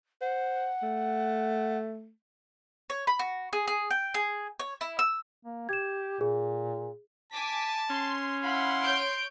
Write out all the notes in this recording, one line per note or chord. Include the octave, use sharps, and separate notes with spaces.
C5 F#5
A3
C#5
B5
F#4
G#4
G#4
G5
G#4
C#5
E4
E6
A#3
G4 G#6 E7
A#2 G#4
G#5 A5 D6 B6
C#4 C6
E4 F5 F#5 B5 C6
C#5 G6 D7